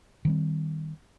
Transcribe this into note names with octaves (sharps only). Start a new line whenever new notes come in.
D#3 G3 C4